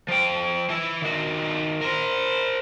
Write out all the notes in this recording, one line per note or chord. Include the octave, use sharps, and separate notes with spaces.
F3 G5
E3 E4
D#3 F#4
A#4 C5